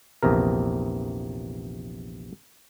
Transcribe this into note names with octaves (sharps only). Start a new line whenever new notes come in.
A#1 E2 C3 A#4